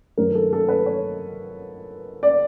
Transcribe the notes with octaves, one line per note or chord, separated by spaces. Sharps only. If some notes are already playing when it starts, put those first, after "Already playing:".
G2 D#3 F#3 A3 A#4
A4
A4
B4
C#5
D5